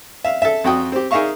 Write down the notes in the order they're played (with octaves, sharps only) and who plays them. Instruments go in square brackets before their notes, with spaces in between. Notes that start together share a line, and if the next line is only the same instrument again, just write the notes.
[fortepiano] E5 F5
A4 E5
F2 F#4 G5 D#6
C4 G4
D#4 G#4 A#4 E5 F5 C#6